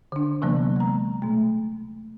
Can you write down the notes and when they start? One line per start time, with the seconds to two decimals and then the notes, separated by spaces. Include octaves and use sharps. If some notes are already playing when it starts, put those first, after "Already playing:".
0.12 D3 D4
0.42 C3 E3 F#3 A#3 B3
0.76 G#3 A#5
1.22 B2 A3